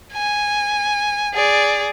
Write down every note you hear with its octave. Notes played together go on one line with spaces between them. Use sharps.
G#5
G#4 D5